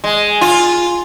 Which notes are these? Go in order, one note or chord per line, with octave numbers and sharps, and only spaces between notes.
G#3
F4